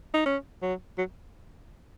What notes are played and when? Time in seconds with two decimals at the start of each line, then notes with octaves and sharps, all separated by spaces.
0.14 D#4
0.26 C#4
0.62 F#3
0.98 F#3